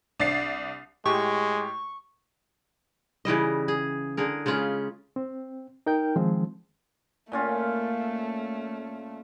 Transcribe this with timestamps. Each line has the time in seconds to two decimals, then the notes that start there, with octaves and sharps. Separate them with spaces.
0.20 C2 D4 A6 C7
1.06 A2 G#3 G4 C#6
3.25 C#3 E3 G3 D#5
3.68 G#4
4.17 D3 G#4 A#4
4.46 C#3 G#3 C#4 F4
5.16 C4
5.86 D#4 A#4 G5 G6
6.16 D#3 F3 G#3 C4
7.32 A#2 A3 C#4 F4